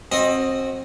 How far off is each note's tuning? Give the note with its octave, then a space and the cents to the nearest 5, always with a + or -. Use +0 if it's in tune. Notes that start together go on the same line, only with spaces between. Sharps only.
C4 +25 F#4 +0 D#5 +0